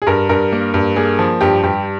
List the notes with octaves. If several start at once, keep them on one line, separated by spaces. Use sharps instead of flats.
G#4
G2 A#4
G2 A#4
A#3
G2
A#3 G#4
F3
G2 G4
G2 G4